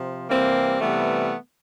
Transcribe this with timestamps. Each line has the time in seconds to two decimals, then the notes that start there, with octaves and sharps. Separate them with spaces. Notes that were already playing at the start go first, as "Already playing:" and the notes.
Already playing: C3 F3
0.29 C3 E3 G3 A#3 C4
0.80 C3 E3 G3 A3 B3